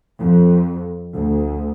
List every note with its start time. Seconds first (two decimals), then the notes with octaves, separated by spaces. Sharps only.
0.19 F2
1.13 D2